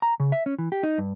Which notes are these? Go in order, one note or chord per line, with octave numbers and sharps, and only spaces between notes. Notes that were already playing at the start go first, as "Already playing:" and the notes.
A#5
C#3
E5
C#4
E3
G4
D#4
G2